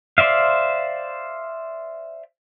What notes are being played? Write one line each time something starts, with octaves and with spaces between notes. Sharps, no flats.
C5 D5 E5 F5